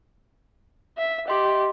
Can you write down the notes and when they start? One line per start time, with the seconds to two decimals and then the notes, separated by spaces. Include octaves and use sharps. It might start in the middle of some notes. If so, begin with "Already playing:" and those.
0.98 E5
1.28 G4 D#5 C6